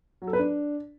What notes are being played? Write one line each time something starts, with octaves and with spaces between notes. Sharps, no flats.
F#3
A4
B4
D4